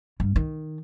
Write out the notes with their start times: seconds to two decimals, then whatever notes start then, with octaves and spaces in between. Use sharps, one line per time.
0.20 G2
0.36 D#3